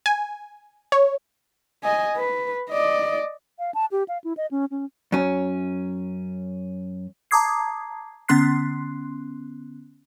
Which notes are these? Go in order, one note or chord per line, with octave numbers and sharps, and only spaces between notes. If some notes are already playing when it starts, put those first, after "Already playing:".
G#5
C#5
D#5 G#5
B4
D5 D#5
F5
A5
G4
F5
E4
D#5
C#4
C#4
F#2 C#4
A5 A#5 D6 D#6 G#6 C7
D3 B3 C#4 C6 F#6 C7